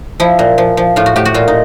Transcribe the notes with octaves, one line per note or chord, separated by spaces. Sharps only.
F3 E4
A#2
F3
F3
A2 F4
F#4
A2 G4
F#4
A#2 F4
D#4